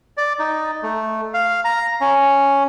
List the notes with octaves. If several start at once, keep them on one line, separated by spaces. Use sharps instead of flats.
D5
D#4
A3
F5
A#5
C#4